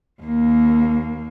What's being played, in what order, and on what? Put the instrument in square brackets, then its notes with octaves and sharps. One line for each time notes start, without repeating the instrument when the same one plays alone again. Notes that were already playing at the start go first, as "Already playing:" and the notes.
[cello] D#2 A#3